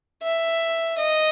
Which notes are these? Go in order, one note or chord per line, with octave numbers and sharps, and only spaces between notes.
E5
D#5